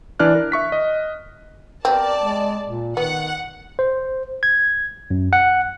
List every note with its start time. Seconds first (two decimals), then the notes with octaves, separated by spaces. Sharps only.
0.19 E3 D4 D5 F6 F#6
0.35 A#4
0.52 E5 C#6 B6
0.72 D#5
1.85 G3 B3 C4 A#4 D5 A5
2.20 G#3
2.65 A#2
2.97 D#3 B3 F#5
3.79 C5
4.43 G#6
5.10 F#2
5.33 F#5